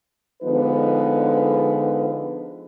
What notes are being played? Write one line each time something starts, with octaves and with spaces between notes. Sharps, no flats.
D3 F3 G#3 B3 D#4 B4